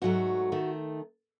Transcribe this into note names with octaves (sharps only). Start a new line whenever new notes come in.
G#2 F#3 A3 F#4
D#3 A3